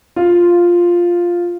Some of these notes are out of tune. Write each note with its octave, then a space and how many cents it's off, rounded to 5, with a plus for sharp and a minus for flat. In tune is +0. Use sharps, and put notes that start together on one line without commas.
F4 +0